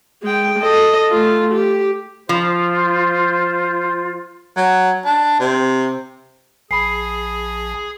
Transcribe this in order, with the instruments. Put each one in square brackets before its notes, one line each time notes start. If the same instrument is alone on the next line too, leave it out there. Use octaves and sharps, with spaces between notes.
[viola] G#3 G5
A4 D#5
A3 F4
G4
[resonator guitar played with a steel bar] F3 [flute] F4 [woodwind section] C5
[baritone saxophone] F#3
D4
C3
[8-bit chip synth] A#1 G#5 [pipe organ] G#4 [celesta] B5 C7